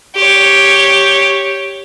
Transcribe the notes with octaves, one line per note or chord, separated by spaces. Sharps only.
G4 C#5